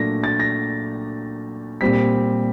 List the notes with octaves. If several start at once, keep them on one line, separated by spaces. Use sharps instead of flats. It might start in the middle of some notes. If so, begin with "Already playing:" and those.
Already playing: A#2 F#3 A3 D4 A#6
A6
A#6
A#2 G3 C4 B6